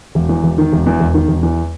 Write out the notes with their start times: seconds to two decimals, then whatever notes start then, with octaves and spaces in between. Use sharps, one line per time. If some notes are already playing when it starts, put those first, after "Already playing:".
0.15 E1
0.29 E2
0.43 E1
0.58 D#3
0.73 E1
0.86 E2
1.00 E1
1.14 D#3
1.28 E1
1.43 E2